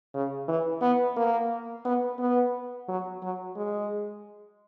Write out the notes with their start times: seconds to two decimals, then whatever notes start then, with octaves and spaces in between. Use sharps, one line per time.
0.14 C#3
0.48 E3
0.82 B3
1.17 A#3
1.85 B3
2.19 B3
2.88 F#3
3.23 F#3
3.56 G#3